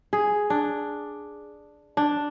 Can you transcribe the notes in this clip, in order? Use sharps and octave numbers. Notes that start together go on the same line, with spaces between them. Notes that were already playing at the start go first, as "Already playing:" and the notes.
G#4
D4
D4